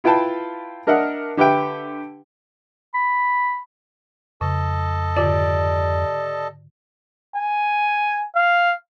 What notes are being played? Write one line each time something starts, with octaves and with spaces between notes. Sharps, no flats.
E4 F4 B4 G5 A5 B5
D4 A#4 D#5 E5 F#5
D3 G4 B4 E5 G5
B5
F2 C#3 A4 D#5 A5
G#2 D3 F4 G4 D5
G#5
F5